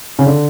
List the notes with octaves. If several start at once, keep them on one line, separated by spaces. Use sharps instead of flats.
C#3
D3